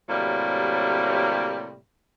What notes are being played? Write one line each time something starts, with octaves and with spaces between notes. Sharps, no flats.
A2 C3 F#3 G3 A#3